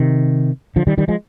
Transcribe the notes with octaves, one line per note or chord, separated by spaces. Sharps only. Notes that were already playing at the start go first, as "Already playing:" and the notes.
Already playing: C3 D#3
D3 F3
D#3 G3
D#3 G3
F3 G#3